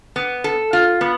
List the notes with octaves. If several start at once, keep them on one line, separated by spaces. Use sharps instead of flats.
B3
A4
F4
B3